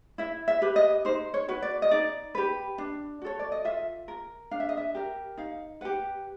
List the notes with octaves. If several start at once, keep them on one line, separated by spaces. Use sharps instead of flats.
E4 E5
E5
G4 B4
D#5
D#4 C5
C#5
F#4 B4
D5
D#5
D#4 D5
G4 B4
D4
F#4 A4 C#5
D5
D#5
F4 E5
A#4
D4 F5
E5
D#5
E5
G4 A#4
D#4 F5
G4 B4 F#5